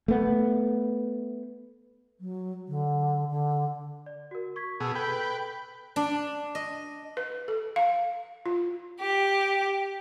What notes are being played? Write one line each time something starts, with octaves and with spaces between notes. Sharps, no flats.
A3 B3
F#3
D3
D3
D5
F#4 A#4
C#6 G#6 B6
B2 G#4 B4 A5 E6
A4 B4 G5
D4
D#5
B4
A4
F5
F4
G4